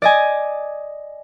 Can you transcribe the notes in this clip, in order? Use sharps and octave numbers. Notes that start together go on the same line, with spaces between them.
D5 D#5 G#5